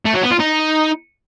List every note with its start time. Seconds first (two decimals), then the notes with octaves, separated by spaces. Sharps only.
0.05 A3
0.14 F#3
0.22 B3
0.31 F4
0.39 D#4